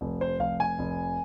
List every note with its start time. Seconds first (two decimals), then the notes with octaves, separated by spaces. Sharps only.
0.01 F1
0.21 C5
0.39 F1 F5
0.60 G#5
0.79 F1